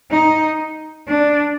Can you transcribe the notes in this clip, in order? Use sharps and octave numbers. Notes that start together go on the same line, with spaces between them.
D#4
D4